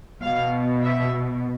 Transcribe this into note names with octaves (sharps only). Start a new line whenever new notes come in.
B2 F5
E5